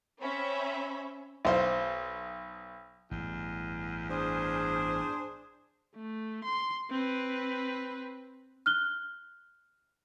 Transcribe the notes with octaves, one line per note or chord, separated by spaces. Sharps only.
C4 C#4 C#5 E5 B5
B1 C5 F5
A1 E2 G2
D4 G#4 C5
A3
C6
C4 B4
F6 F#6 G7